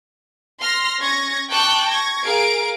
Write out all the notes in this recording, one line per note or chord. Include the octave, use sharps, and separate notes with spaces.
C6 F6 A#6
C#4 C#6 G#6 A#6
G5 A5 C#6 D6 F#6 G6
C#6 G#6 A#6
G#4 A#4 F5 D7